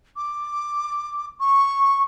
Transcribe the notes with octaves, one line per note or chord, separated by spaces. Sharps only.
D6
C#6